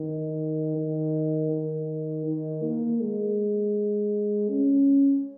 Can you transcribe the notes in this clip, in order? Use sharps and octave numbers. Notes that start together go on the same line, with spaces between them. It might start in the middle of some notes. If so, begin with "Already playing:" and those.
Already playing: D#3
D#3
D#3
D#3
A#3
G#3
C#4